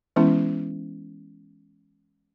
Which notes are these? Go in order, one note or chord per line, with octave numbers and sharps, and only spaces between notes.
E3 G#3 B3 C#4 E4